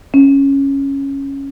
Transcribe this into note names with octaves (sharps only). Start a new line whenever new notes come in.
C#4